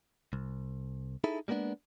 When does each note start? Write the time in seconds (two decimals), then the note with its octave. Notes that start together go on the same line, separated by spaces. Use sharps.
0.33 C2
1.24 D#4 E4 G#4 A4
1.48 G3 G#3 A#3 B3 D4